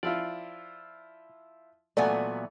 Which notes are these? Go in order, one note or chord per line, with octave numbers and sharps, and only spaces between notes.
F3 E4 F4 D5
A#2 E3 F#3 A3 B3 D5 F#5 G#5